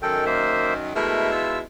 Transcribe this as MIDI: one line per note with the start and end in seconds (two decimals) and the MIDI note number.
0.02 0.91 42
0.02 0.91 51
0.02 0.25 69
0.02 0.25 79
0.26 0.73 58
0.26 0.73 72
0.26 0.73 76
0.96 1.62 47
0.96 1.62 56
0.96 1.31 57
0.96 1.62 64
0.96 1.31 70
1.31 1.58 65
1.31 1.58 88